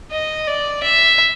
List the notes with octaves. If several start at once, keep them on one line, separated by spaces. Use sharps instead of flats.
D#5
D5
E5